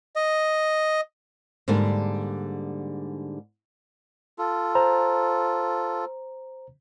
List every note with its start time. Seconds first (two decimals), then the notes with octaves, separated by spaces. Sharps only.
0.16 D#5
1.68 G#2 D3 G3 A#3 D4
4.38 F4 A4
4.75 C5 A#5